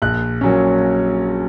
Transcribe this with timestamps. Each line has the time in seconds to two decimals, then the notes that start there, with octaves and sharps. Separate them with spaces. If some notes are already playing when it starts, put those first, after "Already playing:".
0.02 A#1 F#6
0.41 A#2 F#3 C#4